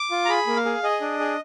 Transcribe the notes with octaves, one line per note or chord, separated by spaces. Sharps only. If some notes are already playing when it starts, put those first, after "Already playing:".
Already playing: D6
F4
A#5
G#4 B5
A#3
F5
G#4
G#4 D#5
D4
G#4